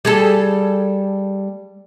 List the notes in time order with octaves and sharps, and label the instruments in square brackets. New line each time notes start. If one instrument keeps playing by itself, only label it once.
[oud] G3 G#4 A4